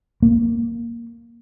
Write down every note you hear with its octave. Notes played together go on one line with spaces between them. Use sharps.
A#3